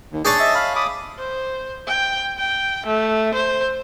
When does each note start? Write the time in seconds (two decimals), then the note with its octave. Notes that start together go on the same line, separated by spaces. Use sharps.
0.12 D#2
0.25 D4 G#4 C#5 A5 G6
0.40 D#5 E5
0.55 F5 B5
0.76 B5 D6 D#6
1.19 C5
1.87 G5
2.38 G5
2.86 A3
3.34 C5